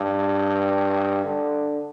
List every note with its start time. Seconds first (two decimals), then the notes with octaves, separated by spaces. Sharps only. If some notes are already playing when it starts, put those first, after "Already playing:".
Already playing: G2
1.24 D3